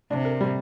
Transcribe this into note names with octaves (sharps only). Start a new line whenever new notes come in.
C3 D4
A#4
G3